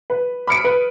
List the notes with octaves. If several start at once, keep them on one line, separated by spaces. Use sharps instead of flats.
B4
B5 F6 C#7 D7
B4